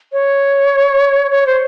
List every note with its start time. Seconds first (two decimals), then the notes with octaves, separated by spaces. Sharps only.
0.12 C#5
1.31 C#5
1.46 C5